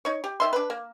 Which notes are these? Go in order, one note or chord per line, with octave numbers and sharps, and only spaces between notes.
D#4 C#5
G4
D#3 E5 C6
D4 B4
A#3